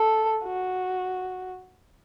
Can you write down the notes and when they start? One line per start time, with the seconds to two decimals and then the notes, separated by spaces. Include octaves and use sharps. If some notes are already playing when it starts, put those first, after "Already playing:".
Already playing: A4
0.44 F#4